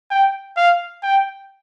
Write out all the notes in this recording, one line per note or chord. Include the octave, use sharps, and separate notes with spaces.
G5
F5
G5